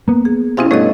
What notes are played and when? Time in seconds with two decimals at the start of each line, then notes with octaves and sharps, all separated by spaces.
0.08 A#3 B3
0.25 G#4
0.57 C3 C#4 E4 F4 G#4 F5
0.71 G2 B2 A3 A4 C#5 D#5